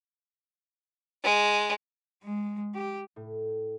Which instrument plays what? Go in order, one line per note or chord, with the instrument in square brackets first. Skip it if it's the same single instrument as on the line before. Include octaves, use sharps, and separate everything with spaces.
[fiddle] G#3
[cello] G#3
G4
[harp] A2